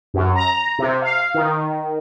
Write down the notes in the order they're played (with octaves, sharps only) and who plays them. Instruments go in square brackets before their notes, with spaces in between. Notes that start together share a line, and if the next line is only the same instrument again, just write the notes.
[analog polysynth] F#2
A#5
C3
F5
D#3